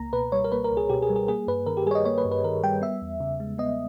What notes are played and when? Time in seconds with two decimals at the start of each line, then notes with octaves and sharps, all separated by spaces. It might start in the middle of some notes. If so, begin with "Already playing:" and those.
Already playing: C#2 A#3 A#5
0.13 B2 B4
0.32 G3 C#5
0.44 A#4
0.52 A#3 B4
0.64 A#4
0.71 C#2
0.77 G#4
0.89 B2 G4
1.02 G#4
1.09 G3
1.16 G#4
1.28 A#3 G#4
1.47 G2 B4
1.66 D#3 A#4
1.77 G4
1.86 G3 G#4
1.91 C#5
1.95 D#5
2.05 A#3 C#5
2.18 B4
2.25 G2
2.31 B4
2.44 D#3 A#4
2.64 G3 G5
2.82 B3 E5
3.02 E2
3.20 C#3
3.40 G#3
3.58 B3 D#5